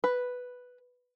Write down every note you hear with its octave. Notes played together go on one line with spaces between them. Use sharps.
B4